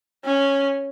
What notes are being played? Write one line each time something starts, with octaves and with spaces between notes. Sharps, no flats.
C#4